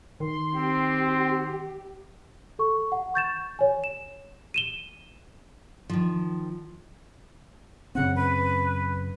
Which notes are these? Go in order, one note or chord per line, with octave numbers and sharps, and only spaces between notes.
D#3 C6
C4 G4
A4 C#6
F#5
C#6 G6 A6 E7
C#5 G#5
E7
D#7 E7 G7
D#3 F3
F#2 C#3 C4 F#5
B4